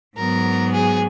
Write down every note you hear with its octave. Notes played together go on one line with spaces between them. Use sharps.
G#2 F#3 B3 A#4
G#4